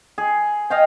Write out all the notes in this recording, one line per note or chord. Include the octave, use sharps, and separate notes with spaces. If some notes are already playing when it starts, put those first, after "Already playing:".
G#4
D#5 F5 G5